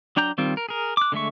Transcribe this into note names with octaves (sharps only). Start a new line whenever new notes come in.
F#3 D4 G5 A#5 G6
D#3 G3 C4 F4
A#4
G#4 A#4
D6 F#6
D3 G#3 A3 E5 C#6